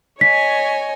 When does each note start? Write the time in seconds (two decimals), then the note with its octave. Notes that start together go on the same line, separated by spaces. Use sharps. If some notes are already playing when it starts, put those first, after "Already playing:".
0.21 C#5 D#5 G#5 B6